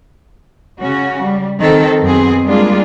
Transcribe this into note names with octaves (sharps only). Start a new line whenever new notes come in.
C#3 C#4 F#4
G3
D#3 C4 A4
F#2 B2 B3 C4 G#4
G3 G#3 A#3 D4 F4 G#4